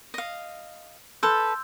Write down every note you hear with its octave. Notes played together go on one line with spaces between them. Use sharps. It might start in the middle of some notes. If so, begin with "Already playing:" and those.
D#5 F5
A4 B4 C6 E6 G6